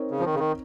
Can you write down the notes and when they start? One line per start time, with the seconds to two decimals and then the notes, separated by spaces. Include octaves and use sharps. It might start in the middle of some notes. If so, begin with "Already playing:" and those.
Already playing: C4 D#4 A#4 C#5
0.11 C#3
0.19 F3
0.25 D#3
0.34 C#3
0.39 D#3